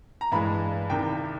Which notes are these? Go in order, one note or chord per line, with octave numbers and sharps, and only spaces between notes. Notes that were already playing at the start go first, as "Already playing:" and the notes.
A#5
G2 E3 G#3 B5
C2 C3 D#3 G5